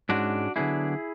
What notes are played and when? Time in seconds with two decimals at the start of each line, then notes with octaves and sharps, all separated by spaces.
0.09 G#2 G#3 C#4 D4 F#4
0.56 D3 F#3 B3 D4 E4 G#4